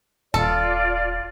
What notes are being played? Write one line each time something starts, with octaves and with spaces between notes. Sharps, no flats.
D#1 F4 A4 D5